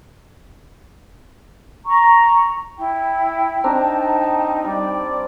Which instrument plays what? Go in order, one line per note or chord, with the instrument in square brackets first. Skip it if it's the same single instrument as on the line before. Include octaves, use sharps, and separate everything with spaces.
[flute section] A#5 C#6
[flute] E4 [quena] G5
[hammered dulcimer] C4 D4 A#5 [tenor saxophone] D#4 [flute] A5
[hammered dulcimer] G3 [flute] D5